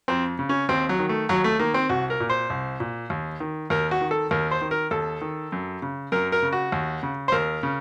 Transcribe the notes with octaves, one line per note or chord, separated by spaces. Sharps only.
F2 C4
C#3
C#4
D#2 C4
F#3
D#3
A3
D#2 F#3
A3
D#3 A#3
C4
C2 F#4
A#4
A#2
C5
C2
A#2
D#2
D#3
D#2 A#4
F#4
D#3
A4
D#2 A#4
C5
D#3
A#4
D#2 A4
D#3
F#2
C#3
F#2 A#4
A#4
C#3
F#4
D#2
C#3
C5
D#2 A#4
C#3